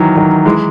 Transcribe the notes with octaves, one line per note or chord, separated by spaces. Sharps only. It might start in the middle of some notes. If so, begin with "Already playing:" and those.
Already playing: D#3 E3 F#3
D#3 F#3
E3 G#3